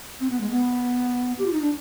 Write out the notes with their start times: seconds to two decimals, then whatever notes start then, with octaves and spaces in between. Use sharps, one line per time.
0.20 C4
0.30 B3
0.40 G#3
0.51 B3
1.39 G4
1.46 F4
1.53 D#4
1.61 D4